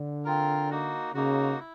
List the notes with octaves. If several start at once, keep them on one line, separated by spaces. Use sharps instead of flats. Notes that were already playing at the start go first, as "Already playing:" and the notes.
Already playing: D3
C4 F4 A#4
A#3 D#4 F#4
C#3 A#3 D#4 F#4
E4